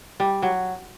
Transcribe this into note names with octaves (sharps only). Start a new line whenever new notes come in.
G3
F#3